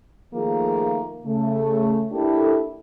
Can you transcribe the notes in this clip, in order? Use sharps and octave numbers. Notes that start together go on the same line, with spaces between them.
D#3 F3 A3 A#3 F4 G#4
C#3 A3
A#3 D4 E4 G4 A4